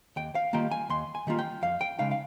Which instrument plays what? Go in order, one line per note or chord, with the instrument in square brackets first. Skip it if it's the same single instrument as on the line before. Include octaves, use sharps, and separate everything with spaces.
[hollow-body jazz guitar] D#2 G5
F5
D#3 G3 A#3 F4 G5
G#5
D#2 C6
G#5
D#3 G3 A#3 F4
G5
F2 F5
G5
C#3 G#3 D#4 F5
F5